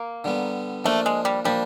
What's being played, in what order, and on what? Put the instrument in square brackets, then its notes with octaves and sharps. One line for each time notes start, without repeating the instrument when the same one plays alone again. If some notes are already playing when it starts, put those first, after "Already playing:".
Already playing: [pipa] A#3
[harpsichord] D3 G3 B3
[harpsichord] F3 A#3 D4 [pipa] A3
[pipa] G#3
G3
[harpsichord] F3 A#3 D4 [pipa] G3